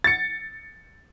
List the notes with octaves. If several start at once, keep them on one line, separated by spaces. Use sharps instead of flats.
A6 C#7